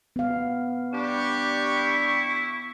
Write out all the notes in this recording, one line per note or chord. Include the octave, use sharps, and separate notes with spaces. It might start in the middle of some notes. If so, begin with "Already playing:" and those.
B3 F5
G3 D4 G4 C#6
E4